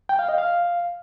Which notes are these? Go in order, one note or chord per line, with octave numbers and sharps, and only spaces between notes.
G5
F5
D#5
F5